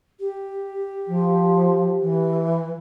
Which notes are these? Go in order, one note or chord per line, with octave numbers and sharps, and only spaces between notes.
G4
F3
E3